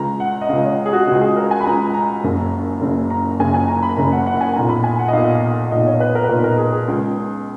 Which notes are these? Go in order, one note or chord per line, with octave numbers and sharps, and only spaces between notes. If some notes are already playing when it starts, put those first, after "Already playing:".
Already playing: C#2 C#3 A#5
F#5
D#5
C#2 C#3 F5
C#5
G#4
F#4
C#2 C#3 F#4
G#4
A#4
G#5
B5
C#2 C#3 A#5
A#5
F#1 F#2 C#3
F#1 F#2 C#3
A#5
F#1 F#2 C#3 G#5
G#5
A#5
B5
F#1 F#2 C#3 A#5
F#5
F#5
F#5
G#5
B1 A#2 A#5
B5
G#5
F#5
D#5
B1 A#2 F5
B1 A#2 D#5
C#5
B4
A#4
B4
B1 A#2 A#4
A#4
G#4
G#4
C#2 C#3